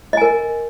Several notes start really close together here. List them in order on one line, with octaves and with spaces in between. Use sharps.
D#5 G#5 A#4